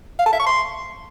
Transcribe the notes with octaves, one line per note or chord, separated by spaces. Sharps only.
F5
A5
E5
C#6
C6